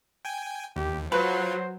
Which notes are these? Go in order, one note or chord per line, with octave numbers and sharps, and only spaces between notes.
G5 G#5
D#2 G4
F#3 F4 B4 C5